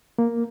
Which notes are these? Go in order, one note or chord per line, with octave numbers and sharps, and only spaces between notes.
A#3